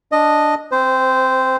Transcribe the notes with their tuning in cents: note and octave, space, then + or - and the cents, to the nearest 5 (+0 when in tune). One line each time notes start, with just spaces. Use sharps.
D4 +0 D#5 -10
C4 +5 C5 -15